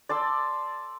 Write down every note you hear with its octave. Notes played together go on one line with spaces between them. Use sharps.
D5 A5 C6 E6